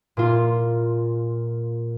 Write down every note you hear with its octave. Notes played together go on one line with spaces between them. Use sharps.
A#2 F4